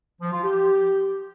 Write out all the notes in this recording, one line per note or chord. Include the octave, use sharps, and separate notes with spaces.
F3
F4
G4